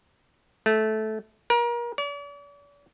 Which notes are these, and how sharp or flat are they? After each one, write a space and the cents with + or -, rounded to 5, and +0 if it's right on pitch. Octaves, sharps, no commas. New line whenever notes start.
A3 -15
A#4 +35
D5 -45